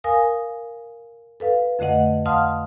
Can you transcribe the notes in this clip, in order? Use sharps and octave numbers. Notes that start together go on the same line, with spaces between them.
A#4 F5 G#5 D#6
A4 B4 F5
F2 D3 A3 D#5 F#5
F5 F#5 A5 C6 D#6 F6